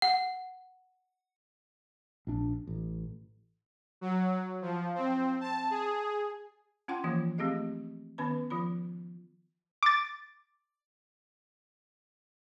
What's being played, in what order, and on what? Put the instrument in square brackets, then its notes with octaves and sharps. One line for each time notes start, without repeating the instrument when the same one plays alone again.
[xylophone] F#5
[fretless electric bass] A#1 D4
A1
[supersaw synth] F#3
F3
C4
A5
G#4
[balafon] C#4 F4 F#5 G5 C6
E3 F3 A#3 F4
A3 C4 G4 G#4 D#5
D#3 B3 C#4 B4 B5
F3 F4 B5
[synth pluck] D6 A6